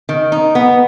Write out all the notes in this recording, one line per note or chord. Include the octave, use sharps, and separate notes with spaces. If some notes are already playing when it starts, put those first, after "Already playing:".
D#3
D#4
B3